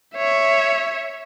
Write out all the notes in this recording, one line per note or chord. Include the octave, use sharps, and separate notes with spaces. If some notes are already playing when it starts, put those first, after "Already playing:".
C#5 E5